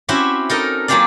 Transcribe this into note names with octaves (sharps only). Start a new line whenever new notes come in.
C4 C#4 E4 F#4 G4 E5
D#4 A4 A#4 D#5
F#3 A#3 F4 G4 G#4 D5